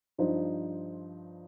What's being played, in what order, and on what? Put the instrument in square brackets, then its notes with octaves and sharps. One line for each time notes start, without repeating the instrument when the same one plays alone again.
[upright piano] G2 F3 D#4 C5